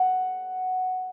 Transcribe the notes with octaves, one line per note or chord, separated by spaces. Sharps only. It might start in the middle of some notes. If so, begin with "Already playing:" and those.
Already playing: F#5